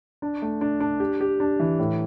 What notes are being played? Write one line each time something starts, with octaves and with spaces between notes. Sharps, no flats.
D4
A3
D4
D4
G4
G4
D4
E3
A2